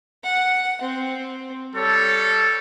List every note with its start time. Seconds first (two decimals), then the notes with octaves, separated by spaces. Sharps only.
0.24 F#5
0.82 C4
1.76 G3 A4 C#5